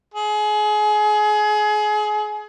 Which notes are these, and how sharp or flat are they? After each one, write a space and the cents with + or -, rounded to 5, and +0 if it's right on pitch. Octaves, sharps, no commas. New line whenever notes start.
G#4 +30